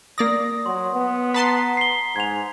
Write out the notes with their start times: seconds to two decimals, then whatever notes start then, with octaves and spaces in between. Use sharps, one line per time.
0.18 A#3 D5 D#6 A#6
0.66 F#3 C6
0.95 B3
1.34 B4 A5 A#5 C6 B6
1.77 C7 G7
2.16 G#2 G#6 F7